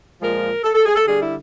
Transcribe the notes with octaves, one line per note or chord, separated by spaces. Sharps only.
A#2 F3 G#3 A#4
A4
A4
G#4
A4
D3 G3 G#4
E4